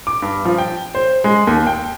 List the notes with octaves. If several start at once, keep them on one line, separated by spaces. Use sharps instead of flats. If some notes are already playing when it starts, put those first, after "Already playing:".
D6
G2
F3
G5
C5
G#3
D#2
G5